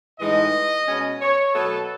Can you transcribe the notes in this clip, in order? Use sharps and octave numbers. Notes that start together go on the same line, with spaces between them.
A2 E3 G#3 D#4 D#5
B2 G#3 C#4
C#5
B2 F#3 B3 A4